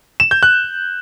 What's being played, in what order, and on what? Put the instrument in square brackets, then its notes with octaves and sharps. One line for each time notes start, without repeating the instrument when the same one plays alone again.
[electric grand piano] E7
G6
F#6